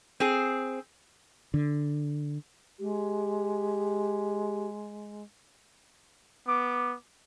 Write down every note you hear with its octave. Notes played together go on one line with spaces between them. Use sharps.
C4 G#4
D3
G#3 G4
B3 D6